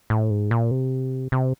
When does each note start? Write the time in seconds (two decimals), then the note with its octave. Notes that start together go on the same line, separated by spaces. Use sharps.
0.10 A2
0.30 G#2
0.51 A#2
0.71 C3
1.32 C3